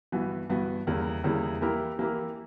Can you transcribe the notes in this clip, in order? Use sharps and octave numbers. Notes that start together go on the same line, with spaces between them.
G2 E3 B3 F#4
G2 E3 B3 F#4
E2 C#3 G3 A#3 E4
E2 C#3 G3 A#3 E4
E3 A#3 E4 G4 A#4
E3 A#3 E4 G4 A#4